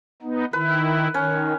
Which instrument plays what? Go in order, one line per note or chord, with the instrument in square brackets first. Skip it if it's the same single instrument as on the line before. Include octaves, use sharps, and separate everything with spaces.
[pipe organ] B3 D#4
[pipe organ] D#3 E4 [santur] B4
[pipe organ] D#3 [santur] C#4 C#5